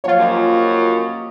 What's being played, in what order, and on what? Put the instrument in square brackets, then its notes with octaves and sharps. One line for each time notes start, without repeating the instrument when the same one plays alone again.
[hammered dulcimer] F3 F#3 A#3 [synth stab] F4 C#5
[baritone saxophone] F#2 [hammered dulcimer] G4 D#5